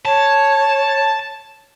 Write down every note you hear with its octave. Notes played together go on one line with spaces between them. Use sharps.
C#5 A5